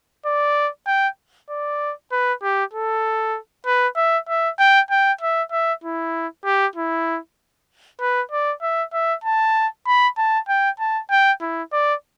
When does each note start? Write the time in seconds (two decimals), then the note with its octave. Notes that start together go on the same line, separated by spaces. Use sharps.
0.26 D5
0.87 G5
1.50 D5
2.12 B4
2.43 G4
2.73 A4
3.66 B4
3.97 E5
4.28 E5
4.59 G5
4.91 G5
5.21 E5
5.52 E5
5.84 E4
6.45 G4
6.76 E4
8.00 B4
8.31 D5
8.62 E5
8.93 E5
9.24 A5
9.86 B5
10.18 A5
10.48 G5
10.80 A5
11.10 G5
11.41 E4
11.72 D5